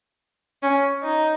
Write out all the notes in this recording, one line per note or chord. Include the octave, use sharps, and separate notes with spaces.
C#4
D#4